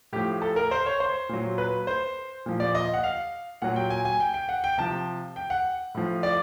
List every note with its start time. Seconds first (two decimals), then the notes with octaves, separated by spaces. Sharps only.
0.13 A2 F3 G4
0.42 A4
0.56 A#4
0.71 C5
0.86 C#5
1.00 C5
1.29 A#2 F#3
1.58 B4
1.87 C5
2.46 A#2 F3
2.60 D5
2.75 D#5
2.94 F#5
3.03 F5
3.62 A#2 F#3 F#5
3.76 G5
3.90 G#5
4.05 G#5
4.20 G5
4.34 G5
4.49 F#5
4.64 G5
4.78 C3 F3 A5
5.36 G5
5.50 F#5
5.95 A2 F3
6.23 D5